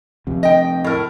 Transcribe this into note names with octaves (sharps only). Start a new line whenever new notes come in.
F2 C3
D#5 G5
A2 A#4